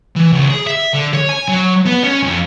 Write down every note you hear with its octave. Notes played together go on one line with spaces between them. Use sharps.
E3
C#2
G#4
E5
D3
C#5
G#5
F#3
B3
C#4
F2